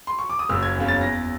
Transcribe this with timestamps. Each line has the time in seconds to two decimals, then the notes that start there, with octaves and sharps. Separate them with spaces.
0.07 C6
0.19 C#6
0.30 D6
0.39 D#6
0.49 F#1 E6
0.63 G#6
0.76 E2 C#3
0.88 A6
1.01 E2 A#6